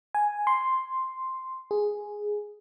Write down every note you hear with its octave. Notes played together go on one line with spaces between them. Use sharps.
G#5
C6
G#4